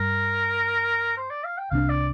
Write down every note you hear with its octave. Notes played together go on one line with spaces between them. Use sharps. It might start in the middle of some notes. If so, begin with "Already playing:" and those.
Already playing: G2 G3 A#4
C5
D5
F5
G5
C2 C3 G3 D4 F5
D5